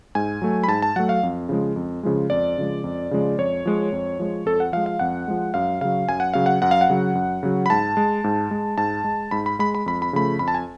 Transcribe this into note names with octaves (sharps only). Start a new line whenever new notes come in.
G#2 G#5
F#3 A3
B5
G#2 A5
A5
F#3 A3 F#5
F5
F2
C#3 F3 G#3
F2
C#3 F3 G#3
F2 D5
C#3 F3 G#3
F2
C#3 F3 G#3
F2 C#5
F3 G#3
F2
F3 G#3
F2 A4
F#5
F3 G#3 F5
F5
F2 F#5
F3 G#3
F#2 F5
C#3 F#3 F5
F#2 G#5
F#5
C#3 F#3 F5
F#5
F#2 F#5
F5
F#5
C#3 F#3
F#2
C#3 F#3
B5
G#2 A5
G#3
G#2
G#3
G#2 A5
G#3
G#2 B5
B5
G#3 B5
B5
F2 B5
B5
C#3 F3 A3 B5
F2 B5
A5
G#5